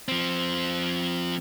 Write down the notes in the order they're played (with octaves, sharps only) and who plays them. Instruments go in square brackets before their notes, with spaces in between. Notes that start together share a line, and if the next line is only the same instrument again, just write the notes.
[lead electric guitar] F3 C4